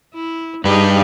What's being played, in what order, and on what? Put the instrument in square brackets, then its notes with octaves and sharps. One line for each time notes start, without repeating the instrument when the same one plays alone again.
[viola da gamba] E4
[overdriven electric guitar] G2 B4 [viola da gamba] D#4 G4 G#4